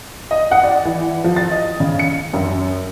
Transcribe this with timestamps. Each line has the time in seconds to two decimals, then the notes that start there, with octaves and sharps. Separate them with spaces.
0.31 D#5
0.51 F#5
0.63 D5
0.85 E3
1.24 F3
1.36 A6
1.51 D#5
1.80 C#3
1.99 C#7
2.33 F#2